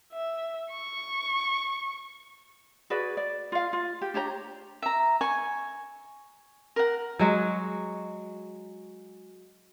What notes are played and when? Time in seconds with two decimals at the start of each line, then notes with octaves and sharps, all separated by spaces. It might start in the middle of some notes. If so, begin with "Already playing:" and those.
0.13 E5
0.71 C#6
2.90 F#4 G#4 B4 D5
3.17 D5
3.52 F4 F5
3.73 F4
4.01 G4
4.14 D4 G4 C#5 A#5
4.82 E5 A#5
5.21 G#5 C#6
6.76 A#4 F#5
7.19 F#3 G#3 F#4